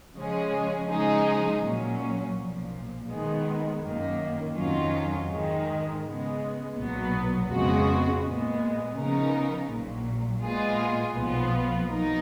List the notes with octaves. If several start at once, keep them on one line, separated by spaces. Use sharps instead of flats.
C#3 F3 G#3 C#4 G#4
C#3 F3 G#3 D#4 G#4
A#2 F#3 C#4
B1 A#2 F3
D#3 G#3 B3
F#2 D#3 A#3
F2 D#3 F#3 C#4 F4
G#2 D#3 G#3
C#3 G#3 B3
B1 A#2 F#3 B3
F2 C#3 G#3 B3 F#4
A#2 G#3 B3
C#3 F3 B3 D#4 A#4
A#1 A#2 F#3
A#2 G#3 B3 F4 G#4
B1 A#2 F3 B3 F4
F#3 B3 D#4 A#4